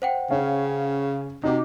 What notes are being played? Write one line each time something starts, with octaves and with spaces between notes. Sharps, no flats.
C5 F#5 G5
C#3 C#4 F5
C3 D#4 F#4 D6